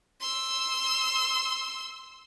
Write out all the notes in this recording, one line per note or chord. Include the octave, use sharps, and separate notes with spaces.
C6 E6